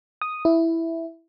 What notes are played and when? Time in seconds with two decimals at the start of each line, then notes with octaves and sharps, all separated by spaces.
0.22 D#6
0.45 E4